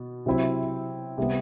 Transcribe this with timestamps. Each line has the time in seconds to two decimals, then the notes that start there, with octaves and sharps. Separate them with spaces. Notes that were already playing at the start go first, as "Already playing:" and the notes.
Already playing: B2 B3
0.26 C3 F#3 C4 E4
1.18 C3 G3 B3